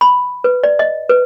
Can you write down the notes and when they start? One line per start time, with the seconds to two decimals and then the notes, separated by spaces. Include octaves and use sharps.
0.01 B5
0.44 B4
0.64 D5
0.79 D#5
1.09 B4